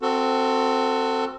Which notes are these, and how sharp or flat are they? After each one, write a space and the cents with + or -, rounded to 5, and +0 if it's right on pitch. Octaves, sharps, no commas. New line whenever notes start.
C4 +0 F#4 +0 A4 +25